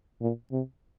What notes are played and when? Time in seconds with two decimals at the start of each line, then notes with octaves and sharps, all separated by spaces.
0.21 A#2
0.51 C3